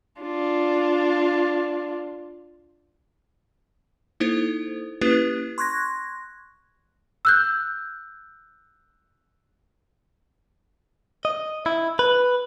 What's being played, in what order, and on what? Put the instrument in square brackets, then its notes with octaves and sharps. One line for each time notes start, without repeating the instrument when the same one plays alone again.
[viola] D4 F4
[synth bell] A#3 D#4 E4 A4 C5
A#3 C#4 E4 G4 B4
C6 C#6 F#6 G#6 A#6
[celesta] E6 F#6 G6
[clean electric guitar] D#5
E4
B4